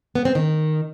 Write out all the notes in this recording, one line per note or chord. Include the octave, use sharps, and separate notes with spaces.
B3
C4
D#3